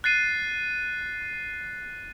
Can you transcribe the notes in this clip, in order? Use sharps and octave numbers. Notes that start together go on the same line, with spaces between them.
F#6 A6 C7 D#7